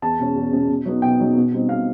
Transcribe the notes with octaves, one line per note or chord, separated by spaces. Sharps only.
E2 A5
B2 G#3 C#4
E2
B2 G#3 C#4
B2
F#3 B3 D#4
B2 G5
F#3 B3 D#4
B2
G3 C4 D#4
B2 F5